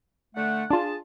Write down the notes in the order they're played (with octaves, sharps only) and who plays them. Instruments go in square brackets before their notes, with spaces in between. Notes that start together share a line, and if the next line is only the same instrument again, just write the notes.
[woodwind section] D3 A3 F#5
[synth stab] D4 F4 [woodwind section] G#4 A5